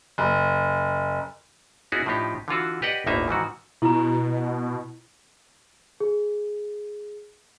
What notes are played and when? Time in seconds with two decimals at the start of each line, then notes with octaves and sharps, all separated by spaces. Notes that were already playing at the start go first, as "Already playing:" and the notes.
0.18 F#1
1.92 B3 C#4 D#4 E4 F#4 G#4
2.06 A2 F3 D4 D#4 G4
2.48 D3 E3 F4 F#4
2.82 G4 B4 D5 D#5 F#5
3.06 G1 D2 A2 A#3 D#4 E5
3.28 G#2 D#3 E3 F#4
3.82 B2 E4 A#5
6.00 G#4